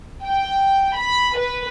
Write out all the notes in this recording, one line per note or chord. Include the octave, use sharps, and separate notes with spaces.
G5
B5
B4